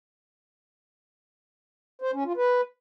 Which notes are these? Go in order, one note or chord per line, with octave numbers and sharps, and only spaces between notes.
C5
C#4
F4
B4